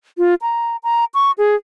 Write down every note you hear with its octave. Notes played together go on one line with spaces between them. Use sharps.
F4
A#5
A#5
C#6
G#4